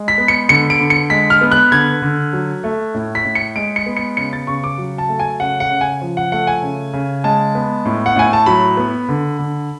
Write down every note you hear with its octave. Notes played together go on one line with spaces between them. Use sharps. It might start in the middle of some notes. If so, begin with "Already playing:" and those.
Already playing: G#3
B6
B3
C#7
D3 C#7
D7
D3
C#7
G#3 B6
F6
B3
F#6
D3 G#6
D3
F#3
A3
A2
B6
A2
C#7
G#3 D7
C#7
B3
C#7
C#3 C#7
A6
C#3 C#6
D6
F#3
A5
A3
G#5
C#3 F#5
F#5
C#3
G#5
F3
F#5
A3 F#5
G#5
C#3
C#3
G#3 A5
B3
A2
F#5
A2 G#5
A5
F#3 B5
B3
D3
D3